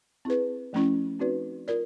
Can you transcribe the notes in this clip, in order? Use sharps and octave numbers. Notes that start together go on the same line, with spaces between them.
C4 E4 G#4 B4
F3 A3 C#4 E4
C4 D#4 F#4 B4 D5
F4 A#4 D5